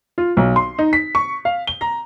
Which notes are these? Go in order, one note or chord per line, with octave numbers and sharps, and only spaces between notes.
F4
B1
C6
D#4
B6
C#6
F5
G7
A#5